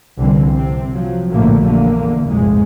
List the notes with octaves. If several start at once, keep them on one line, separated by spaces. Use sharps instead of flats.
C2 D3 E3 C4
C3 C4
F3 F#3
A#1 A2 D3 F#3 A3 A#3
E2 D3 A#3
F#1 B1 F2 A2 F3 G#3